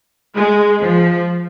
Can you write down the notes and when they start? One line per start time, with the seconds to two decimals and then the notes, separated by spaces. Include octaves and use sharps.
0.35 G#3
0.81 F3